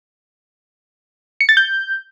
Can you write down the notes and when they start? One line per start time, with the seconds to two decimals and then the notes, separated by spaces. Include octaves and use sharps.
1.41 C#7
1.49 A6
1.57 G6